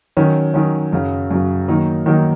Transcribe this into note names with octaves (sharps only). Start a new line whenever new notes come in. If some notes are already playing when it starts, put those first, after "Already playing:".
D#3 F#3 C#4
D#3 F#3 C#4
F#2 C#3 F#3
F#2 C#3 F#3
D#3 F#3 A#3 D#4
D#3 F#3 A#3 D#4